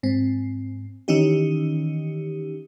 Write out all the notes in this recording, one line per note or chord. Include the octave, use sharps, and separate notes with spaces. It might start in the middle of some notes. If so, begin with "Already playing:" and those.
G#2 C4
D#3 E3 C#4 D#4 G4